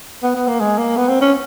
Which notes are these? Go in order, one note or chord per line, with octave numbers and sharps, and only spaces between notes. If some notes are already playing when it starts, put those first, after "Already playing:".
B3
B3
A#3
G#3
A#3
B3
C4
C#4